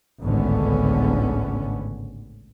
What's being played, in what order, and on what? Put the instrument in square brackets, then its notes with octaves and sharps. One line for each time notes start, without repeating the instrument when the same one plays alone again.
[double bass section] G#1 C#2 A2 D3 B3 C#4